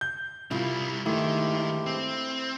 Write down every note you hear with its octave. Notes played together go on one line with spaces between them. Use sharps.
G6
C2 G3 E4 F4
G2 D#3 G#3 A3 E4 G4
C4